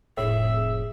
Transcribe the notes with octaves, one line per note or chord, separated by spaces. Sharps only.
F1 A2 G#4 E5